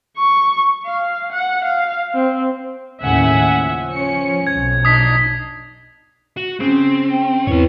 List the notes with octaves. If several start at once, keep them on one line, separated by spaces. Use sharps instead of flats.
C#6
F5
F#5
F5
C4
D#2 A2 C#3 E5 F#5 G#5
F3
C#4 C#7
B1 F2 G#6
D4 D#4 D#6 B6 C7
F#4
C#3 C4
G5
E2 B3 C4 E4 B4 C#5